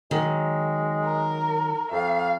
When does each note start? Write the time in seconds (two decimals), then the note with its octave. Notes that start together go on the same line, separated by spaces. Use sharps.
0.11 D#3 F#3 G#3
1.04 A#4
1.92 F2 F5